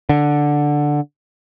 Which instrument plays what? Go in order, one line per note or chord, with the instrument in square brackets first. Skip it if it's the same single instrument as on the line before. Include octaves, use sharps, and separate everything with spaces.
[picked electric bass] D3